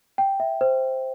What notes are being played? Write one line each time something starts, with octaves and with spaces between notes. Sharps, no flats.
G5
E5
C5